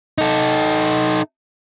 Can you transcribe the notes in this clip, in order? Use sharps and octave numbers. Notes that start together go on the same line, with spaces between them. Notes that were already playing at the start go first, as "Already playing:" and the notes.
D#4 A4